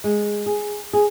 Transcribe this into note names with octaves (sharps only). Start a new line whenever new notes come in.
G#3
G#4
G#4